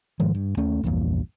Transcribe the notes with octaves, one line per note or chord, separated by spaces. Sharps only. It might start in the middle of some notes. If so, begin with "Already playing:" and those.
G#2 D#3 F3 G#3
G2
D#2 A3 C#4
A#1 E2 G2 A#2